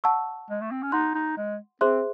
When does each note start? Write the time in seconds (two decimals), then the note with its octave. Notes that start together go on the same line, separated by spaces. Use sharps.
0.04 F#5 A5 C#6 E6
0.50 G#3
0.61 A3
0.71 C4
0.82 C#4
0.92 D#4 F#5 C6 F#6
1.15 D#4
1.37 G#3
1.81 C4 G#4 C5 E5 C6 F#6